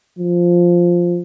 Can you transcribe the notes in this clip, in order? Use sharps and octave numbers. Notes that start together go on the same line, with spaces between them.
F3